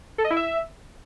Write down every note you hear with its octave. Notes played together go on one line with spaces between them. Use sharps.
A4
D#5
E4
E5